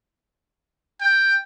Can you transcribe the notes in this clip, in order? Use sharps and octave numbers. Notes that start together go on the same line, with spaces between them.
G5